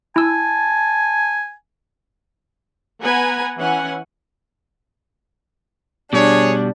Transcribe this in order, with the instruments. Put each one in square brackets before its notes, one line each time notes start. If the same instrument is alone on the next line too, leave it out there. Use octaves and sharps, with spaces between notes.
[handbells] E4 E6 [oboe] G#5 [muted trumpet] A5
[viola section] B3 B4 F#5 G#5 A#5
E3 C#4 F#5 G#5
[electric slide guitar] B2 G3 [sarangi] D4 [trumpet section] G#4 C#5